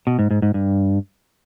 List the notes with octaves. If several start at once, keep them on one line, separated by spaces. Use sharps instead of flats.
B2
G#2
G#2
G#2
G2